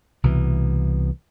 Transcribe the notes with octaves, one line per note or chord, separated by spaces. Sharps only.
C2 B2 E3